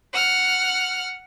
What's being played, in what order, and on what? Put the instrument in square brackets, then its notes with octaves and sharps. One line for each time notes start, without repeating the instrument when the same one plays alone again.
[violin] F#5 F6